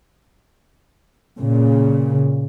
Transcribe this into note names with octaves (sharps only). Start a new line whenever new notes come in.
A#2 C#3